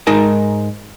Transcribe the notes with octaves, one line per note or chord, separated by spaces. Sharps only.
G#2 G#3 D#4 A#4 A5